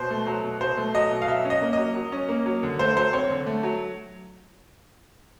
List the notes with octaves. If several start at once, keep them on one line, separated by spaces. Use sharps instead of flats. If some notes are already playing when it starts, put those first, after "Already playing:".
Already playing: B2 C5
A3
F#3
B2
B2 C5
A3
F#3 D#5
B2
F5
F#3 E5
C#4
D#5
A#3
F#3 D#5
F#3
C#4
A#3
F#3
D3
A3 C5
F#3 C5
C4 C#5
D3
A3
F#3